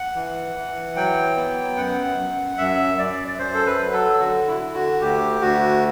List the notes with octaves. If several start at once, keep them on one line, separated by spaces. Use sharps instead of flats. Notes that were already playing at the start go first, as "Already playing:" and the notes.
Already playing: F#5
E3
E3
F#3 G5
B3
F#2 F#5
F#2
F#2 E5
F#2 D5
D5
F#2 C5
A4
B4
F#3
A4
D3 F#4
E4
D3
F#4
D2 G4
D2 F#4